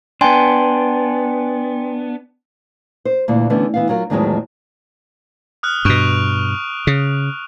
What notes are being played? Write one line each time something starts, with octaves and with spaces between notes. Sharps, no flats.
B3 D4 G5 G#5 C6
C5
D2 A#2 E3
D3 E3 A3 B3 C#4
E3 B3 F5
F#3 F4 A#4
E2 A2 D#3 F3 F#3 G#3
D#6 F6 F#6
G2 B2 C#6 D7 F7
C#3